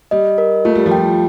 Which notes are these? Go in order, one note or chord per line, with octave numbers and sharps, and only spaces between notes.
G3 D#5
A#4
A3 F4
G3
F3
G5
G3